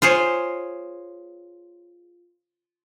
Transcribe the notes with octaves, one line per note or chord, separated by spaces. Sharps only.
F4 G#4 C5 C#5